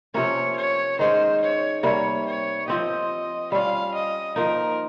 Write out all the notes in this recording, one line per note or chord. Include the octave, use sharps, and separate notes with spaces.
C3 F3 A#3 C#4 C#5
C#5
D#3 G#3 C#4 C5
C#5
C3 G3 A#3 C#5
C#5
F3 C4 G4 D#5
G3 C#4 F4 F5
D#5
F3 A#3 D#4 A#4